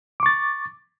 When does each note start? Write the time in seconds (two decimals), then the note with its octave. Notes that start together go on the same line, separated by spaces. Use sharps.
0.20 D6
0.23 C#6
0.26 A6